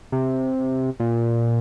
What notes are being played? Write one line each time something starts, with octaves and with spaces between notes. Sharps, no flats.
C3
A#2